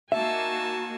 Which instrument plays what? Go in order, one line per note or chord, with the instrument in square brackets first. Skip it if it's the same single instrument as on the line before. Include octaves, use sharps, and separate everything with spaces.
[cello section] A#3 D#4 F#4 [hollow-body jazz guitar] E5 [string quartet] G#5 A5 E6